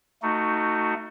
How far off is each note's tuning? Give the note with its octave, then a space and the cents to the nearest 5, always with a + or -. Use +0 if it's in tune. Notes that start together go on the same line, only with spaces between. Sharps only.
A3 +25 D#4 +0 F#4 +0